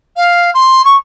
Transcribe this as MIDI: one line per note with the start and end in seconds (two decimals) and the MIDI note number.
0.16 0.50 77
0.54 0.82 84
0.85 0.96 85